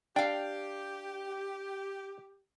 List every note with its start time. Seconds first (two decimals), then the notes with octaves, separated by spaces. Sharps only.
0.16 D4 G4 F5 G5